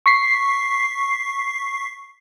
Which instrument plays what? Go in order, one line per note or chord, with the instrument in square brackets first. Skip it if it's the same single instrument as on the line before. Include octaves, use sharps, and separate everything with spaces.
[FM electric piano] C#6 B6 C7